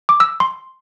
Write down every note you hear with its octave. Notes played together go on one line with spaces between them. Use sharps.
D6
E6
C6